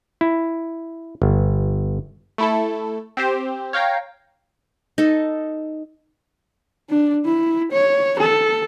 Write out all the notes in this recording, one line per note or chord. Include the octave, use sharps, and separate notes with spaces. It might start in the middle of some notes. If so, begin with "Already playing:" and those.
E4
G1
A3 E4 A4
C4 G4 C5
C#5 F5 G5 A#5
D#4 A4
D4
E4
C#5
A4